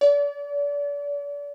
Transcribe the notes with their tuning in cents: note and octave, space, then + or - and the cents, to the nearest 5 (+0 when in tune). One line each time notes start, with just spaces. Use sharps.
D5 -35